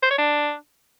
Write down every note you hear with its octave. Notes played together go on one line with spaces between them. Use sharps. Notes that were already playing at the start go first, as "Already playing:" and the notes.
C5
C#5
D4